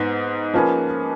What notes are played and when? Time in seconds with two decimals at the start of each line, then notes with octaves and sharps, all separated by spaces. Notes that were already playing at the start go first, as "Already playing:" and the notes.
Already playing: G#2 B3 D#4
0.54 F3 A#3 C#4 G#4 B4